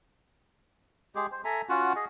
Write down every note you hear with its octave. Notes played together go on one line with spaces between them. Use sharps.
G#3 G4 G#4
C5
A4 E5 G#5 A#5
C#4 F4 F#4 F#5
G#4 D#5